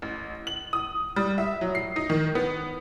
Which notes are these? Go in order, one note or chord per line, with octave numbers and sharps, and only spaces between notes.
A1
F#7
D#6
G3
E5
F#3
C7
D#4
D#3
B3